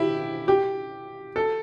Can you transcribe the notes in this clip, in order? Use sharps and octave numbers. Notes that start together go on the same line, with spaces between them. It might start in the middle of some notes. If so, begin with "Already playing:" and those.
Already playing: E4 G4
G4
A4